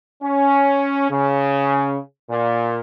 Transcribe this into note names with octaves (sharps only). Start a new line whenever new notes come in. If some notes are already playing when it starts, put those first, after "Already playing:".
C#4
C#3
A#2